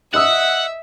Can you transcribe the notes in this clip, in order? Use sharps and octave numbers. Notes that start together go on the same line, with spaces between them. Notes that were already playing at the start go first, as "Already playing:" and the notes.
D#5 E5 F#5 D#6 E6